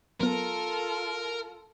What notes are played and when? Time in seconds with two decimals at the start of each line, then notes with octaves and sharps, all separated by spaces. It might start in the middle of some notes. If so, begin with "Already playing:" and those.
0.21 F#3 B3 F4 A4 A#4